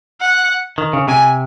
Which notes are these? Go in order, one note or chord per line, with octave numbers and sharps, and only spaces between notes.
F#5
D#3
C#3
C3 G#5